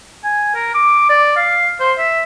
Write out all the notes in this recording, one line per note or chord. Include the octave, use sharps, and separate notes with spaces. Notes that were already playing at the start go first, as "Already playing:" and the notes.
G#5
A#4
D6
D5
F5
C5
E5